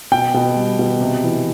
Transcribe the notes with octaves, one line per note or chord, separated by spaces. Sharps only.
B2 G5
B2
G3
B2
C3
E3